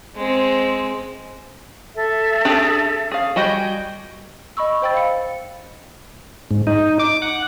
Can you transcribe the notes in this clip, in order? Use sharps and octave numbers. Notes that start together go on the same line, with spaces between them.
G#3 C4
A4 E5
D4 G4 G#4
G#4 F5
G3 F#4 D#5 G5 G#5 G6
D#5 B5 C#6 E6
C5 D#5 G5 B5 E6 A6
F5 C#7
G#2
D#4
D6
F#5